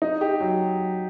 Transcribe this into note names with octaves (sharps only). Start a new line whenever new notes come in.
D#4
G4
F#3